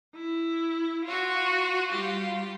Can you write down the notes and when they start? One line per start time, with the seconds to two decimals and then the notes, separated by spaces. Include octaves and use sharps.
0.15 E4
1.04 F4 F#4
1.91 G3 F4 G4 F5